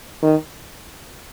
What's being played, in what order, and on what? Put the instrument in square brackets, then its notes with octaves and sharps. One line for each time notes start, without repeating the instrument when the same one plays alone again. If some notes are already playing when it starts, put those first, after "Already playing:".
[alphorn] D#3